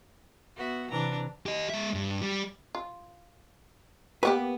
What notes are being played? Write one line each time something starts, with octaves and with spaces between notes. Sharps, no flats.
B3 F#4 E5
C3 E3 D4 A#5
G4 D#5
G#3 E5
G2
G3
F4
A#3 B3 F#4 G4 B4